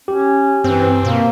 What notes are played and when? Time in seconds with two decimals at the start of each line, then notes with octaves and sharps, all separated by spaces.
0.08 C#4 G4
0.64 G2 E3 C4
1.05 B2 A#3